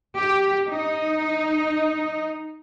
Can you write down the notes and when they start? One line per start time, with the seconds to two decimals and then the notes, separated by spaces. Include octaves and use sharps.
0.16 G4
0.69 D#4